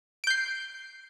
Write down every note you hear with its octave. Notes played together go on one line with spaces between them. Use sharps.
G6 C7 D7